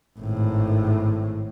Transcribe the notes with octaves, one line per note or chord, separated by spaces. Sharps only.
G#1 A2